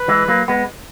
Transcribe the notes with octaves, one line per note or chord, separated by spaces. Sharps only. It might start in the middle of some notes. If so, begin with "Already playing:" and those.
Already playing: B4
E3 G#3
F#3 A#3
G#3 B3